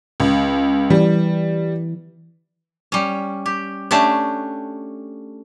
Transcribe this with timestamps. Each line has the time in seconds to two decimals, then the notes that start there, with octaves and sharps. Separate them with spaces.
0.20 C#2
0.90 E3 G3
2.92 G3 C#4
3.46 G4
3.91 A3 C#4 D4 G4